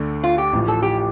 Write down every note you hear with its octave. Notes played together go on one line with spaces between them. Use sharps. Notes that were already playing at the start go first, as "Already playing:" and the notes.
Already playing: D2 D3 A3 D4
F4
G4
A1 A2 F3
A4
G4